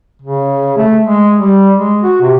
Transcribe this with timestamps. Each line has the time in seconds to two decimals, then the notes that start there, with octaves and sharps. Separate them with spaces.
0.22 C#3
0.77 A3
1.03 G#3
1.37 G3
1.77 G#3
2.02 F#4
2.22 C3